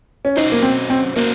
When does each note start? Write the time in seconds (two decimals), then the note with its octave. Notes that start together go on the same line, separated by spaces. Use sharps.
0.25 C#4
0.37 F#3 C#4 D#4 F#4 C5
0.52 A#3
0.63 C4
0.90 C4
1.16 F#3 A#3 C#4 F#4 C5